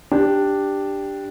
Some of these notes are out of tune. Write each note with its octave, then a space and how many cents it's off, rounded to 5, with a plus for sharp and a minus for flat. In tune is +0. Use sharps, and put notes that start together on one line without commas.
D4 +0 G4 +0